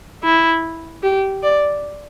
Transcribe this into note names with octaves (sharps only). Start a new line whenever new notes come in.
E4
G4
D5